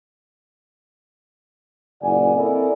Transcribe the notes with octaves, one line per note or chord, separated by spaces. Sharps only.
F#1 A#2 E4 D5 F#5 G#5
C4 E4 A4 A#4 D5 D#5